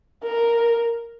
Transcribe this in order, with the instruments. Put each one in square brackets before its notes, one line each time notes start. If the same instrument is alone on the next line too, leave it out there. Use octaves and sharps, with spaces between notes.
[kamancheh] A#4